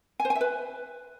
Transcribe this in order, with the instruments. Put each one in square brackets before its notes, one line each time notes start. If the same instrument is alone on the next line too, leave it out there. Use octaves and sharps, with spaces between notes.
[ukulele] G#5
C5
G#5
E5
B4